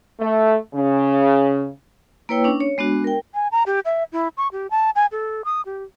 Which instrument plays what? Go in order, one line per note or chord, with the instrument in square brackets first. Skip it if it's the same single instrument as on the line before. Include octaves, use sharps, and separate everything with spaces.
[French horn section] A3
C#3
[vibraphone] A#3 E4 B4 C#5 G5 E6
C#4 D4
C#5
G#3 B3 D4 F#4
A#4 G5
[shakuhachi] G#5
A#5
G4
E5
E4
C#6
G4
A5
G#5
A4
D#6
G4